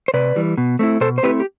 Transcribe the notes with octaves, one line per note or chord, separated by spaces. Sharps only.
C5
C3 B4 D5
E3 G3
B2
A3 C4 E4
B2 A4 C5
C5
A3 C4 E4 G4 B4
G4